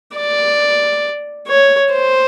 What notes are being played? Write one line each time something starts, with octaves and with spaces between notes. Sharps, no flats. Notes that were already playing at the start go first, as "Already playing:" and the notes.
D5
C#5
C5